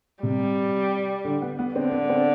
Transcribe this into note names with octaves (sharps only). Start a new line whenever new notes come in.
C3 G3
D3
B3
B3
D3 C4
B3
C4